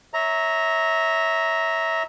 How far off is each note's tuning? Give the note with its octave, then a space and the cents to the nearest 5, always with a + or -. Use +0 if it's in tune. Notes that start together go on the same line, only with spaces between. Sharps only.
C#5 +0 E5 -20 A#5 +0